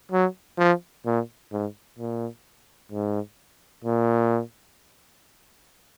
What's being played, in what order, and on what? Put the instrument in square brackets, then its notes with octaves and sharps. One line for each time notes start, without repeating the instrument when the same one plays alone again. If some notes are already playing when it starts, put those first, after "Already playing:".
[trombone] F#3
F3
A#2
G#2
A#2
G#2
A#2